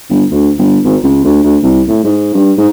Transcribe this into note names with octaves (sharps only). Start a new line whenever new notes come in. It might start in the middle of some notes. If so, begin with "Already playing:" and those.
G1
D2
G1
G#1
C#2
D2
D2
C2
A2
G#2
G2
G#2